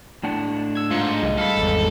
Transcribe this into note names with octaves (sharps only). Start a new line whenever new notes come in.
A2 D4 F#5
E6 G#6
G#2 F4 C#7
C2 G3 G#3 D#5
A4 F5 B5
G#1 E2